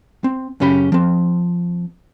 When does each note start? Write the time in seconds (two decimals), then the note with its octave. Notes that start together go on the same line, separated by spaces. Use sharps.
0.24 C4
0.60 F#2 C#3 C#4 G4 B5
0.92 F3 C4